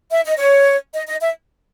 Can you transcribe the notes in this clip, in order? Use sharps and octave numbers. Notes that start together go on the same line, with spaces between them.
E5
D#5
C#5
D#5
D#5
E5